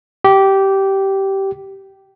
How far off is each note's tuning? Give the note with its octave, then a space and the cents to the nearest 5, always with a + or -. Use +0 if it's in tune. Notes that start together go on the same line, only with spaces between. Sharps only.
G4 -15